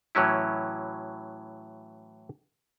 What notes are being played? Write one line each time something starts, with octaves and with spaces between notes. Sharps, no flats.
A2 E3 F#3 C#4 E4